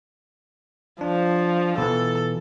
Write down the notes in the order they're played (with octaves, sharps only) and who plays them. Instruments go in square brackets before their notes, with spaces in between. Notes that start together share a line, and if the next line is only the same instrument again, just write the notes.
[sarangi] F3 [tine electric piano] D4
[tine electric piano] B2 E3 [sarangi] A4